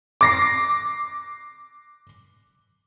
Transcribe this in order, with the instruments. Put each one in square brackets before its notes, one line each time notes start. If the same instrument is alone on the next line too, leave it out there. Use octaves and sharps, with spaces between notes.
[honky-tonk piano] D6 A#6 C7